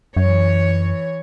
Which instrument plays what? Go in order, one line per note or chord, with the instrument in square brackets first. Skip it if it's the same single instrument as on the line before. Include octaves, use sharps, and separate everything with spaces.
[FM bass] F#2 [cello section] E3 C#5